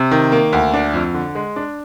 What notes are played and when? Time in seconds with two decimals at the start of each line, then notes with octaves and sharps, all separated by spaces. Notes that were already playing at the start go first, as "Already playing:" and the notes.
Already playing: C3
0.11 D#3
0.32 A#3
0.53 D2
0.74 D4
0.94 F2
1.14 D3
1.35 G#3
1.56 D4